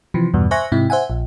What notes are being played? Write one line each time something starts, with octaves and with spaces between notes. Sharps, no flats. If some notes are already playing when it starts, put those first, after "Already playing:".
C3 E3 F3
E2 G2 B2
C5 E5 G#5 C#6 F#6 A#6
G#2 C3 E4
C5 E5 F#5 G#5
A#1